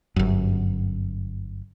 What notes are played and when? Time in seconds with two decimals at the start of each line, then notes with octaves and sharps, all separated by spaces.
0.16 G1 F#2